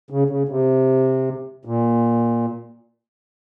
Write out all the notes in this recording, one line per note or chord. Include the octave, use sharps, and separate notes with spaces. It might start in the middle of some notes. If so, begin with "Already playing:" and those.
C#3
C#3
C3
A#2